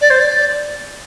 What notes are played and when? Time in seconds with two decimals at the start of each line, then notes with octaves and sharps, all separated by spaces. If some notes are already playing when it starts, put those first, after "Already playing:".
0.01 D5
0.10 C5
0.20 D5